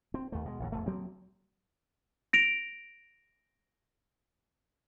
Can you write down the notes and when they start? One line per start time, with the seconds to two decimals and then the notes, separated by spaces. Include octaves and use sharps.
0.14 C4
0.32 D#2 A3
0.45 B2 G#3
0.60 A#1 D#2 G#2
0.72 E1 A3
0.86 D2 F#3 A#3 C4
2.33 A#6 D7 F7